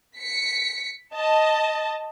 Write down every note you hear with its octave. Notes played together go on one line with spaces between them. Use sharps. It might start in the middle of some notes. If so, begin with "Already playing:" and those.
B6 C#7
D#5 A5